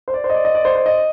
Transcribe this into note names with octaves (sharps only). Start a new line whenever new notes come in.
C5
D5
C5
D#5
D5
D#5
D5
C5
C5
D#5